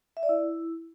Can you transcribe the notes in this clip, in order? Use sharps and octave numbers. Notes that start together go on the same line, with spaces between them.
E5
D5
E4